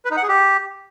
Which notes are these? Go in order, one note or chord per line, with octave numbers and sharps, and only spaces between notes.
B4
D#4
F#5
G#4
G4